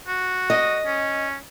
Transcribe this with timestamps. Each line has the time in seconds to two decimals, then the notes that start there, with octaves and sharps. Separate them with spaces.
0.08 F#4
0.50 D#5
0.86 C#4